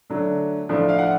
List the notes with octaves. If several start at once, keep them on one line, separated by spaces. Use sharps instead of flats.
D3 F#3 A3 D4
A2 F3 A3 D4
F5
F#5